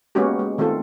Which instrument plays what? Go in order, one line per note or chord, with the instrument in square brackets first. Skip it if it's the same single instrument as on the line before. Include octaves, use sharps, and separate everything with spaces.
[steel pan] G#3 A#3 B3 C#4 F#4 G4
G#3
D#3 A3 C4 F4 A4